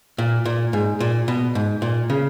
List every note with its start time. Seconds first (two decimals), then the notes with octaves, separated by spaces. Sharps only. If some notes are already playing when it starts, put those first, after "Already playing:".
0.18 A#2
0.45 A#2
0.73 G#2
1.00 A#2
1.28 B2
1.55 G#2
1.82 A#2
2.10 C#3